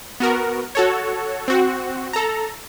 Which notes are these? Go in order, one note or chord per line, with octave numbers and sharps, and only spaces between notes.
B3 F#4 A#4
F#4 A4 C#5
C4 F#4
A4 A#5